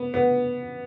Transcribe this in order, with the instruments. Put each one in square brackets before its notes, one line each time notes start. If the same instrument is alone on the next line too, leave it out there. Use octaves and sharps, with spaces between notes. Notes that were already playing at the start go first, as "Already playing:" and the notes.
Already playing: [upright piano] B3
B3